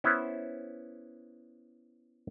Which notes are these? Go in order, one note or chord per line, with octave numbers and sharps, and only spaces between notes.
B3 C#4 E4 C5